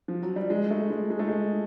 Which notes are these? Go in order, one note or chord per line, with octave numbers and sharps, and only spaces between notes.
F3
F#3
G3
G#3
A3
G#3
G#3
A3
G#3